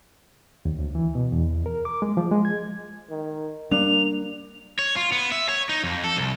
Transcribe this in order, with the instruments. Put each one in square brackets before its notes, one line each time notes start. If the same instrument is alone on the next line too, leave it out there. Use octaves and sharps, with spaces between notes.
[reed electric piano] D#2
D2
E3
B2
E2
A#4
D6
G#3
F3
G#3
G#6
[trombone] D#3
[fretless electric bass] G3 [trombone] A#3 [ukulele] D4 [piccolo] F7
[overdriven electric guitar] C#5
F4
B3
E5
C#5
D#4
F2
A4
C2